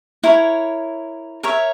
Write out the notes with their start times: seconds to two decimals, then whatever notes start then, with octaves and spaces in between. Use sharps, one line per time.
0.23 E4 A#4 C#5
1.43 A#4 C#5 E5